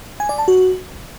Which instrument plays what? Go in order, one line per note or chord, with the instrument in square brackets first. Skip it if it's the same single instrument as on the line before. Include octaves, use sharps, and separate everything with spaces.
[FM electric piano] G#5
D5
A5
F#4